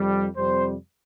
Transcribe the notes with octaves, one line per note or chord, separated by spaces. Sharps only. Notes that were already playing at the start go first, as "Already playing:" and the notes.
Already playing: F2 C3 G3
F2 C3 G3 C5